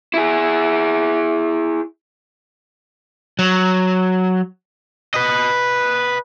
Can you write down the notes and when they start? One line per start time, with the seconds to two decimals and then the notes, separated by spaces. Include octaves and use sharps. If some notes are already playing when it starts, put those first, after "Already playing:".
0.14 E4 G#4
3.39 F#3
5.14 B4 D#5